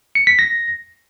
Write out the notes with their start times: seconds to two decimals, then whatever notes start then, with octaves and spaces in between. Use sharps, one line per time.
0.15 C#7
0.27 B6
0.39 A#6